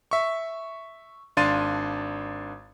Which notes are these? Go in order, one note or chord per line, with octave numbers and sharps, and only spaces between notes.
E5 C#6
G#1 D4 F5 C6 A6 D#7